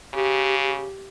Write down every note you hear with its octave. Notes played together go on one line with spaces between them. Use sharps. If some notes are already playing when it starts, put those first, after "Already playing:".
C#3 G4